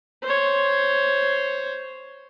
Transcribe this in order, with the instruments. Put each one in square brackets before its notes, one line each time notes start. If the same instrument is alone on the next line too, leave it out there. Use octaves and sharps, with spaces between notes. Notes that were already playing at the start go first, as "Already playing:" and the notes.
[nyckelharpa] C5 C#5